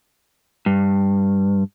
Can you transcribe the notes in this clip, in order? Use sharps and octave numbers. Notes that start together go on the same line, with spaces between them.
G2